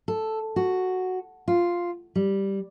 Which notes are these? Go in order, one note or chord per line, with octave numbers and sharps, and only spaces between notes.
A4
F#4
F4
G3